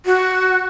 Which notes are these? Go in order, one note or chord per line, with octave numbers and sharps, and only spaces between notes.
F#4